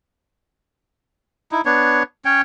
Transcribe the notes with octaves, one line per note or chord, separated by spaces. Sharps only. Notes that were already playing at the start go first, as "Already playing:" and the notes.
D#4 E4
B3 D4 C#5
C#4 C#5 G5